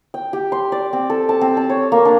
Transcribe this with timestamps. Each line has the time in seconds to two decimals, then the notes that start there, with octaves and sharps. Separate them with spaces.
0.14 G5
0.33 G4
0.52 C6
0.72 D5
0.93 C4
1.10 A4
1.29 A5
1.41 C4
1.57 A5
1.70 C#5
1.92 A#3
2.05 D4